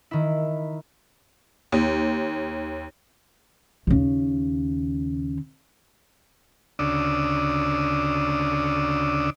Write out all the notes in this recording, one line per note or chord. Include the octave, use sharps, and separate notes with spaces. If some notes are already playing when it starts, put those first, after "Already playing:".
D#3 E4
D#2
D#2 C#3
D2 C#3 D4 D5 D#6 E6